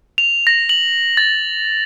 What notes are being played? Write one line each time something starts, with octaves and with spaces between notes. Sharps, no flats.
F7
A#6
F#7
A6